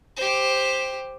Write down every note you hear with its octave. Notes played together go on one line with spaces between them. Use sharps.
G4 C5